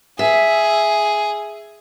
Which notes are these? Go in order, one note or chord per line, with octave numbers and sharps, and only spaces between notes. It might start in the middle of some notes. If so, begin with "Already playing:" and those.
G#4 E5